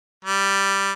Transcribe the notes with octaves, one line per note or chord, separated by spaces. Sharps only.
G3